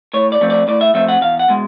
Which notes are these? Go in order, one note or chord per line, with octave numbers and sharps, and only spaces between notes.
A2 C#5
D5
F3 A3 C4
D5
A2 D5
E5
F3 A3 C4 E5
F#5
E2 F5
F#5
B2 G#3